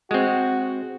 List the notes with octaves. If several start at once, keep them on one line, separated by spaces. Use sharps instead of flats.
G#3 C4 F#4